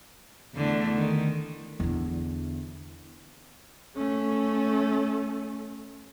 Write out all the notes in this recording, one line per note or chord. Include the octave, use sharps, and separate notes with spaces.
E2 D3 A3
D#3
E2 D3
A3 C#4